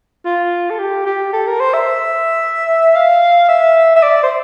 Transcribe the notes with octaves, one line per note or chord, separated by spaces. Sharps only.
F4
A4
G4
G4
A4
A#4
C5
E5
F5
E5
E5
D5
C5